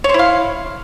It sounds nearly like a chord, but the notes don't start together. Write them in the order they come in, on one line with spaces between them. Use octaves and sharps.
C#5 C5 E4 F5